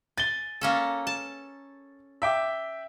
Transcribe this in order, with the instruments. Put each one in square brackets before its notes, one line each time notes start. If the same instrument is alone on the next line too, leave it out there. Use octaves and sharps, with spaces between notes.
[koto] G#5 [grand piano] A6 G7
[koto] A#3 C#4 A4
A5
[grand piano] E5 G5 D6